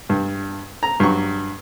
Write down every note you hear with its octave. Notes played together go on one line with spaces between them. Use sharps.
G2
A#5
G2 F#3 C#6